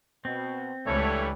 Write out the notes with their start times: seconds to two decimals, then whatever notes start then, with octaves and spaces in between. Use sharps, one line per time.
0.25 B2 C4
0.86 C#2 D3 E3 G3 A3 C#5